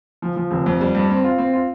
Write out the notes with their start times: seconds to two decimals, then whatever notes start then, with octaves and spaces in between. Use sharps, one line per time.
0.22 F3
0.36 F3
0.51 F1
0.66 F2
0.81 G3
0.95 G2
1.10 C4
1.24 F4
1.38 C4
1.54 F4